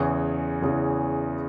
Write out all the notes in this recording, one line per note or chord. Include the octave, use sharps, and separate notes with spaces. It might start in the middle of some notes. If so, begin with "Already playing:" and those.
Already playing: E2 C#3 E3 C#5
E2 C#3 E3